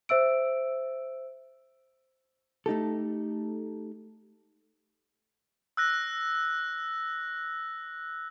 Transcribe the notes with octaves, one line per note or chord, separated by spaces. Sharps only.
C5 E5 E6 D7
A3 D#4 G4 A4
E6 F#6 A#6